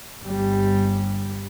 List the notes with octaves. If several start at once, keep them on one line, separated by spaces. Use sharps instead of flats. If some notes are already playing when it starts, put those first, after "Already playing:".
G1 G3